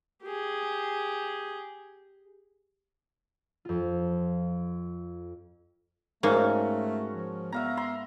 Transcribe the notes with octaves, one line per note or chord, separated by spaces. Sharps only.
G4 G#4
F2 F4
G#2 A3 A#3 C#4 F#4
F3
B3 E5 F5 A#5
E5 A#5 C6